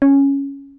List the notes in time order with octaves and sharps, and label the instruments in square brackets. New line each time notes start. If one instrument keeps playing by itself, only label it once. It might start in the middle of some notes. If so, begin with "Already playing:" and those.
[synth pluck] C#4